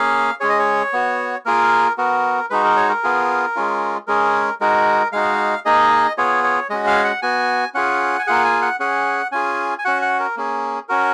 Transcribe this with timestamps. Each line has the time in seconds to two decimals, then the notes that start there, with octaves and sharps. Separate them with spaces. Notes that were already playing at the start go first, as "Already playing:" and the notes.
Already playing: A#3 C#4 G#4 F5
0.40 G#3 C#4 G#4 C#5
0.50 D#5
0.59 C#5
0.93 B3 F#4
1.45 A#3 F4 G#4 A#4
1.98 B3 F#4 A#4
2.50 G#3 D#4 F#4 B4
2.64 A#4
2.76 C#5
2.89 A#4
3.04 B3 F4 G#4
3.56 G#3 C#4 F4
4.07 G#3 C#4 G#4 A#4
4.61 G#3 D#4 F#4 A#4
5.12 G#3 D#4 F#4 F5
5.65 A#3 D#4 G#4 D#5
6.18 B3 F4 G#4 C#5
6.44 C#5
6.70 G#3 C#4 F#4 D#5
6.87 F5
7.04 F#5
7.22 B3 F#4 G#5
7.74 C#4 F4 G#4 F#5
8.19 G#5
8.27 A#3 F4 G#4 F#5
8.44 G#5
8.62 F#5
8.80 C#4 G#4 F#5
9.32 C#4 F4 G#4 G#5
9.79 G#5
9.85 C#4 F#4 F#5
10.02 F#5
10.20 A#4
10.36 A#3 C#4 G#4
10.89 C#4 F#4 A#4